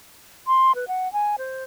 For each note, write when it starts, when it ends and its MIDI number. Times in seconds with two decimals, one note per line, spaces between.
0.47 0.75 84
0.75 0.88 71
0.88 1.11 78
1.13 1.36 80
1.38 1.64 72